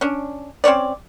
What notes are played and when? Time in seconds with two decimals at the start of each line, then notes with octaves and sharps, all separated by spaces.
0.01 C#4 D4
0.64 C4 C#4 C#5 D5